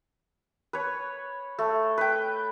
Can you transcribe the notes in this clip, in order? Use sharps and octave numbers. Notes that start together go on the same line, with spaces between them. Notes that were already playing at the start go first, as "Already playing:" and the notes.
B4 C#5
A3
B4 G5